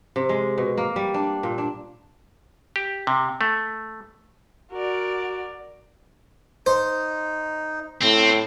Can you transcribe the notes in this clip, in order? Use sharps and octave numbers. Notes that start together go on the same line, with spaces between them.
C3
G#3
B2
A#3
G3
D4
A#2
D4
G4
C3
A3
F#4 A#4 D5
D#4 C5
A2 C4